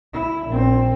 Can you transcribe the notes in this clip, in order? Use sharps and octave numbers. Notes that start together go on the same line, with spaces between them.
E4
A#1 C4